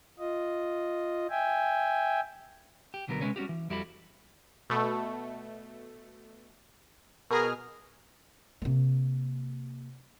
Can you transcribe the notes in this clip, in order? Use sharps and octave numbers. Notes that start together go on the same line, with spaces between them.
F4 D#5
E5 G5 G#5
G4
C2 B2 D3 F#3 B3 A#4
C3 D#3 G#3 C#4 B4 C#5
G3 C#4 F#4 G4
E3
F2 G3 E4 F#4 A4 B5
B2 A3
B2 G#4 A#4 F6
C3 A#3